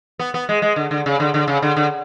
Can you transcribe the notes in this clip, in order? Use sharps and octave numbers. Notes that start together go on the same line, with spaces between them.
B3
B3
G#3
G#3
D3
D3
C#3
D3
D3
C#3
D3
D3